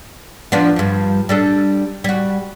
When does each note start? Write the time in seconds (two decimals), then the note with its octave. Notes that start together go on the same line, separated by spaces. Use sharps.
0.52 F3 B3 D4
0.76 G2 F3
1.29 G3 D4 A4
2.04 G3 F#4